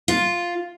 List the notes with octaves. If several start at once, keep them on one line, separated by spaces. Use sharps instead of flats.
F4